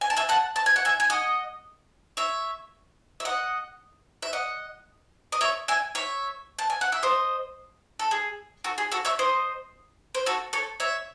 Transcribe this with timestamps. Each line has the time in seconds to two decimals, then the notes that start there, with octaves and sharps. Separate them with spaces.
0.01 G#5
0.10 A5
0.17 E5 G#5
0.29 F#5 A5
0.56 A5
0.66 G#5
0.76 F#5
0.85 E5 G#5
1.00 G#5
1.10 D#5 F#5
2.17 C#5 E5
3.20 E5
3.25 D#5 F#5
4.22 E5
4.33 D#5 F#5
5.32 D#5
5.41 C#5 E5
5.68 E5 G#5
5.95 C#5 E5
6.59 A5
6.70 G#5
6.81 F#5
6.92 E5
7.03 C5 D#5
7.99 A4
8.11 G#4
8.64 F#4 A4
8.78 G#4
8.92 F#4 A4
9.05 C#5 E5
9.19 C5 D#5
10.15 C5
10.26 F#4 A4
10.53 A4 C#5
10.80 C#5 E5